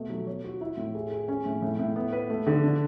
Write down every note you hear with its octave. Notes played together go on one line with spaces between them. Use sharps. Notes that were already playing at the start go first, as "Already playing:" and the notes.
Already playing: B2 A3
F#3
C#5
F#4
E4
A2
G#4
G#4
C#4
A2
A2
A2
B3
B4
A3
D3
D4